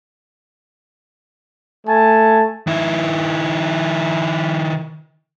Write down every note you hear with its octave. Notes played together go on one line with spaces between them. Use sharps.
A3 G#5 A5
D#3 E4